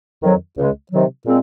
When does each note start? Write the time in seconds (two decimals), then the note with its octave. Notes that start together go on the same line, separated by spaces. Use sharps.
0.22 F2 D#3 F#3
0.57 C#2 C#3 G#3
0.91 C3 D#3 F#3
1.26 A#2 G#3 C4